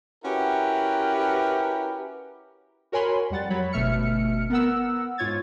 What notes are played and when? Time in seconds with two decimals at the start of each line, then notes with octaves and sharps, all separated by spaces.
0.24 C#4 E4 F#4 G4 A#4 B4
2.92 F#4 A#4 C#5 G#5 B5 C6
3.30 F2 G3 F#5 A6
3.50 F#3 C#5 B5
3.73 G1 B2 A3 E5 F6 C#7
4.50 B3 A#4 F#5 E6
5.18 G#2 F4 C#5 G#6 A6